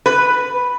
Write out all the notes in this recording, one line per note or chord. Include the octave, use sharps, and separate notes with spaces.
B4